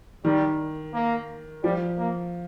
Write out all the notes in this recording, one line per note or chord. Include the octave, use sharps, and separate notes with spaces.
D#3 G3
A#3
F3 G3
A#3